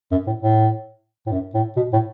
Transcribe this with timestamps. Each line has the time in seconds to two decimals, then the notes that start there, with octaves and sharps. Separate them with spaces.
0.11 F#2
0.27 A2
0.42 A2
1.26 A2
1.32 F#2
1.54 A2
1.76 B2
1.92 A2